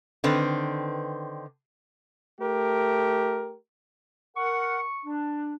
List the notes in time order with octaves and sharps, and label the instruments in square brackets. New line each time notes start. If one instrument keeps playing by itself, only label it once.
[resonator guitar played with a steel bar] D3 D#3 C4 B4
[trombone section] A3 G4 A#4
[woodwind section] A#4 F#5 [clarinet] C#6
[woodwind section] D4